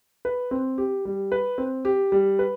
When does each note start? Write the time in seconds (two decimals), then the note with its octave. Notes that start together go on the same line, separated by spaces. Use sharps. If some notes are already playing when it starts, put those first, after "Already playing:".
0.25 B4
0.51 C4
0.78 G4
1.05 G3
1.32 B4
1.58 C4
1.85 G4
2.12 G3
2.39 B4